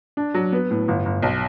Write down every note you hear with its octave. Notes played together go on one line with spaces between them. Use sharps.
D4
F#3
B3
A2
G1
G1
B1